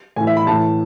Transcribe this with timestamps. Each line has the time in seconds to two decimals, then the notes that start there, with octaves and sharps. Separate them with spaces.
0.16 A2 E3 G#5
0.27 E5
0.37 B5
0.47 A2 E3 A5